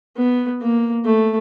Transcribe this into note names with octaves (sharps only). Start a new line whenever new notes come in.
B3
A#3
A3